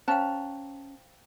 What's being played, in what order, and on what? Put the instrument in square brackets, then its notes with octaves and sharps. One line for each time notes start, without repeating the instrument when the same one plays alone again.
[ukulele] C#4 A5 A#5 [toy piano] C5 F5 G5